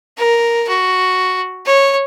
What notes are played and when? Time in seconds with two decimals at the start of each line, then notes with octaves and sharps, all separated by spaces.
0.18 A#4
0.69 F#4
1.66 C#5